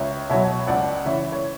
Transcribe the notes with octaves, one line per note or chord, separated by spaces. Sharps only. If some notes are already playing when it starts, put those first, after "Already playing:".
Already playing: C#2 C#5 E5
B2 F#3 C#5 E5
C#2 D5 F#5
C#3 E3 C#5 E5
C#5